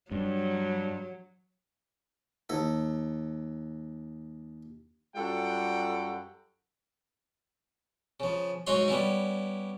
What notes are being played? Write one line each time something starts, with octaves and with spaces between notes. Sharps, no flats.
G2 F#3
D#2 A4
F#2 G3 F4 A4 F#5 G5
C#3 F3
G#2 F#3 D#4 F#4 C#5 C6
G3 B3 C#4 E4